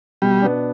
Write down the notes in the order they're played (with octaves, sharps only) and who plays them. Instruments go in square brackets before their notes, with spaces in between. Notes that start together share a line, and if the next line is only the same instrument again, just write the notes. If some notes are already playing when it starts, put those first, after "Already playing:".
[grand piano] B2 [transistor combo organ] G3
[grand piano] B3 D4